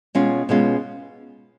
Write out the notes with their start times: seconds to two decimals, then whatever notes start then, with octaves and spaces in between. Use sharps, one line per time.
0.15 B2 G#3 C#4 F4
0.49 B2 G#3 C#4 F4